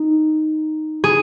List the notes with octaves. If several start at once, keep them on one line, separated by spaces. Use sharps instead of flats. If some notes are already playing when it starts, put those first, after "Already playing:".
Already playing: D#4
G#4